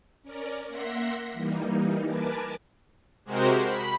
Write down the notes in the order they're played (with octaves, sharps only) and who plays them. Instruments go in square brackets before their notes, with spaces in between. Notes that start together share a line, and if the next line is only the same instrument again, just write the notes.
[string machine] C#4 A#4 D5
A#3 E5 F#5 C6 A#6 B6
E3 G3 A#3 D#4
A#4 B4 G#5 A5 D6
[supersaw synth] C3 G#3 F#4 G4 A#4 C5
B5